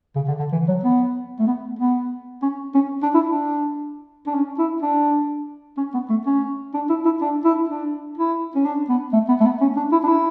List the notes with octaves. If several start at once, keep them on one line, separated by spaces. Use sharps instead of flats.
C#3
D3
D3
E3
F#3
B3
A3
B3
B3
C#4
C#4
D4
E4
D4
D4
C#4
E4
D4
C#4
B3
A3
C#4
D4
E4
E4
D4
E4
D4
E4
C#4
D4
B3
A3
B3
A3
B3
C#4
D4
E4
D4
E4